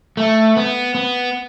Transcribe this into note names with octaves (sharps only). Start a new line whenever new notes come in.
A3
B3
B3